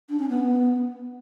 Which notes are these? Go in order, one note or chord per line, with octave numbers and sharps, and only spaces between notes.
D4
C#4
B3